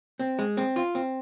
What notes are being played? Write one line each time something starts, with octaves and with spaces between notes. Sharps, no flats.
C4
G#3
C4
F4
C4